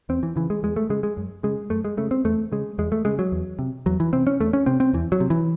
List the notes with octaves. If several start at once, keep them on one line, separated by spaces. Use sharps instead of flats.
E2 C4
E3
C#3 E3
G#3
E2 G#3
A3
C#3 G#3
G#3
F#2
C#3 G#3
F#2 A3
G#3
C#3 A3
C4
E2 A3
C#3 G#3
E2 G#3
A3
C#3 G#3
F#3
E2
C3
E2 F#3
E3
C3 C4
C#4
E2 A3
C#4
C3 C4
C4
E2 E3
F#3
C3
E3